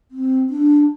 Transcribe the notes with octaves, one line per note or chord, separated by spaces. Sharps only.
C4
D4